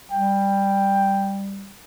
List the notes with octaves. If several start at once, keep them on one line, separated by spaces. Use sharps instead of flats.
G3 G5